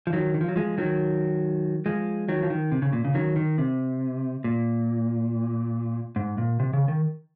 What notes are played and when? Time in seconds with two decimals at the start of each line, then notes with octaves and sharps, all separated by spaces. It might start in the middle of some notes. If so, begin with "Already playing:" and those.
0.07 F3
0.13 D#3 F#3
0.34 D#3
0.41 F3
0.48 F#3
0.56 F3 G#3
0.78 D#3 F#3
1.86 F3 G#3
2.29 D#3 F#3
2.43 F3
2.50 D#3
2.72 C3
2.82 C#3
2.93 A#2
3.05 C#3
3.14 D#3 F#3
3.36 D#3
3.58 C3
4.44 A#2
6.16 G#2
6.38 A#2
6.60 C3
6.73 C#3
6.88 D#3